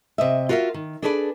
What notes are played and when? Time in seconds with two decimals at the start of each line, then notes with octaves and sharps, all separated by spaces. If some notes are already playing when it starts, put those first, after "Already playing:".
0.18 C3 D#5 E5
0.49 F4 F#4 A#4 D5 E5
0.74 D#3
1.02 D4 G#4 A4 B4 C5 D5